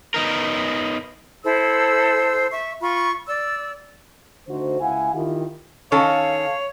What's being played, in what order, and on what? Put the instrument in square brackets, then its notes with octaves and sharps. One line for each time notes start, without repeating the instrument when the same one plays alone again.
[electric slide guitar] B3 D#4 A#4
[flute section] E4 A4 C5 E6
E5 C#6
F4 B5 C#6
D5 E6
[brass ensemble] D3 A3 D#4 F#4 C5
C#2 E4 F5 F#5 G#5
D#3 E4 F4 G4
[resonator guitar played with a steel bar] D#3 C#4 A4 [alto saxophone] C#5 [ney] F5 [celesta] A5 C#6